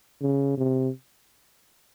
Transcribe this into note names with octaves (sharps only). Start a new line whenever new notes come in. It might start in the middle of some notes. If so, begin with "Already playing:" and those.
C#3
C3